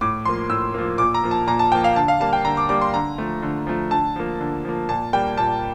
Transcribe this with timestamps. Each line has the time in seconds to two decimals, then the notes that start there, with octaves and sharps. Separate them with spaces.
0.01 A2 D6
0.25 F3 A#3 C6
0.50 A2 E6
0.74 F3 A#3
0.98 A#2 D6
1.14 A#5
1.23 F3 A#3
1.31 A5
1.47 A#2 A#5
1.59 A5
1.72 F3 A#3 G5
1.84 F5
1.96 D3 A5
2.08 F5
2.20 G3 A#3 A5
2.33 G5
2.45 D3 A#5
2.57 D6
2.69 G3 A#3 D6
2.81 C6
2.94 D3 A#5
3.18 F3 A3
3.42 D3
3.67 F3 A3
3.91 D3 A5
4.16 F3 A#3
4.40 D3
4.64 F3 A#3
4.89 A#2 A5
5.13 G3 A#3 G5
5.37 A#2 A5